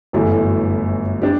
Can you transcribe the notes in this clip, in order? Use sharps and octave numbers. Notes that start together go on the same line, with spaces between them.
G1 F#2 E3 A3 E4
D4 G4